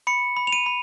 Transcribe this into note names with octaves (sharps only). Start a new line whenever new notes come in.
B5 C#7
B5
F7
D#7
B5